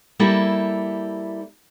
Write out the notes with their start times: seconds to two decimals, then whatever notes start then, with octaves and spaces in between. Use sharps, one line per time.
0.20 G3 A#3 E4 A4 E5